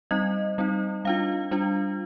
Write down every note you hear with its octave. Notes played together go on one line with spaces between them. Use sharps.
G3 C4 D#4 D#5
G3 C4 D#4
G3 D4 F4 F5
G3 D4 F4